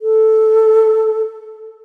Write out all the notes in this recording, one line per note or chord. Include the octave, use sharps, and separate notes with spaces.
A4